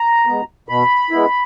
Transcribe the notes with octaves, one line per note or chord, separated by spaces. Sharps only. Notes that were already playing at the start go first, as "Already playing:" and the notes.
Already playing: A#5
G#3 B3
B2 B5
G#3 B3 E4